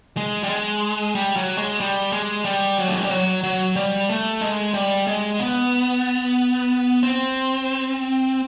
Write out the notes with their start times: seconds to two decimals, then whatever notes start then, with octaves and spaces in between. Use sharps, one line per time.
0.17 G#3
0.43 G3
0.49 G#3
1.15 G3
1.36 F#3
1.58 G#3
1.80 G3
2.12 G#3
2.45 G3
2.78 F#3
2.88 A3
2.95 G#3
3.03 G3
3.11 F#3
3.44 F#3
3.76 G3
4.09 A3
4.41 G#3
4.74 G3
5.07 G#3
5.39 B3
7.03 C4